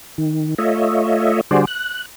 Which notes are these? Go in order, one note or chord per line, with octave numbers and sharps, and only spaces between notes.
D#3
A3 F4 C#5 D#5 E5
D3 G3 F#4 G#4 C5 D5
F#6